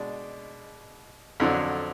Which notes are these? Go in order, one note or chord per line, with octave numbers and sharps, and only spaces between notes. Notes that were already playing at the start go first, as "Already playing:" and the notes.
Already playing: B2 G#3 D4 D5
F2 D3 F#3 D4